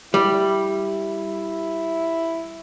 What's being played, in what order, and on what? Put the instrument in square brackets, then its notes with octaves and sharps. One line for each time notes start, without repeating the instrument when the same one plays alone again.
[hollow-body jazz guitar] G3 [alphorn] E4